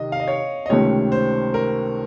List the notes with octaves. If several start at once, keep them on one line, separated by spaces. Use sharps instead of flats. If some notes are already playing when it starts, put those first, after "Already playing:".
Already playing: C3 D#3 D#5
F5
D#5
C#5
D#5
C#2 C3 D#3 A3 C#4 C#5
C5
A#4